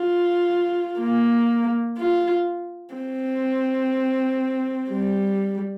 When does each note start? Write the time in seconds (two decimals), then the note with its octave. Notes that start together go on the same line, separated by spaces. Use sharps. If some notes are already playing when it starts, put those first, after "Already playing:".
Already playing: F4
1.00 A#3
1.98 F4
2.95 C4
4.91 G3